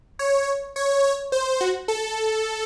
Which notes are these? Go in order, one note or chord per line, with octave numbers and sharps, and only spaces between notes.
C#5
C#5
C#5
C5
F#4
A4